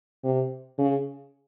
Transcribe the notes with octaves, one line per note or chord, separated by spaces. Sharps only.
C3
C#3